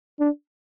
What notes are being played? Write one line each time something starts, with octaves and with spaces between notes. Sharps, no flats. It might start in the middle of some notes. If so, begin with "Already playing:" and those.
D4